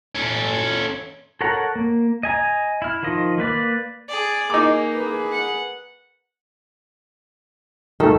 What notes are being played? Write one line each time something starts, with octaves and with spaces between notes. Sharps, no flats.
C#4 A4
A4 A#4 C#5 F#5 A#5
A#3
D#5 G#5 A#5
E4 F6
D#3 F3 F4 D#5
A#3 B4 D5
G#4 D5
A#3 D#4 G#4 D6
G#4 B4
F#5
D#3 A3 A4